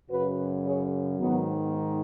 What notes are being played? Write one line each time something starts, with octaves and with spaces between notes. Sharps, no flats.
F#2 C#3 F#4 B4
G#4 C#5
G#2 D#3 F#3 B3